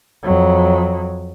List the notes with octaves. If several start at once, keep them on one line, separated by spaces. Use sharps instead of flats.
F2 F#3